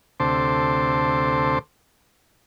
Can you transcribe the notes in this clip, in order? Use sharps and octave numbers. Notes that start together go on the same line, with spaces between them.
D2 C3 A4 C5 C6 D6